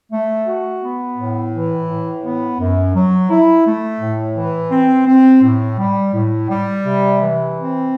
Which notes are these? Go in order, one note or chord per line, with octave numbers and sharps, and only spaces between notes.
A3
F#4
B3
A2
E3
A2
B3
F#2
F#3
E4
A3
A2
E3
C4
C4
A2
G3
A2
G3
C3
E3
C4